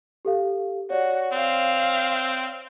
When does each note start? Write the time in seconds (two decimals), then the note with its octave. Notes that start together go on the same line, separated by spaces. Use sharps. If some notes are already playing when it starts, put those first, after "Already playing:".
0.25 G4 A4 F5
0.90 F#4 C#5 D5
1.33 C4 F5 F6